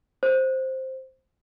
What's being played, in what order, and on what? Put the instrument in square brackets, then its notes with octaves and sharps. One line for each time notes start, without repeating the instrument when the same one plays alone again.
[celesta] C5